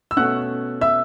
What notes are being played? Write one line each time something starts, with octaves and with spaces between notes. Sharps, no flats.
E6
B2 A3 C#4 F#5 F#6
E5 E6